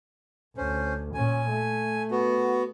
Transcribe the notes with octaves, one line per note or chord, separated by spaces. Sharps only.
D2 C#4 C5
A#2 C#4 G#5
A3
B3 F#4